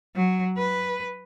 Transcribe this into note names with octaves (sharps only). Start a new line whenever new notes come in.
F#3
B4